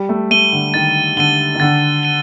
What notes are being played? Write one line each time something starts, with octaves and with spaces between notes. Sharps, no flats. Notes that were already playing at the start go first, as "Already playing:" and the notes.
Already playing: G3
A3
A3 D#7 G7
D3
D#3 A6
D3 D#7 G7
D#3
D3 A6
D#7 G7